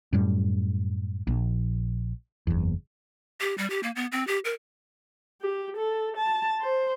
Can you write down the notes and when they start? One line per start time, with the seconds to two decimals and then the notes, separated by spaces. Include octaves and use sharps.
0.13 F#2 A2 G3
1.27 A#1
2.47 F#1 E2
3.40 G4
3.58 G3
3.70 G4
3.83 A#3
3.96 B3
4.12 C4
4.27 G4
4.45 A#4
5.42 G4
5.77 A4
6.17 A5
6.61 C5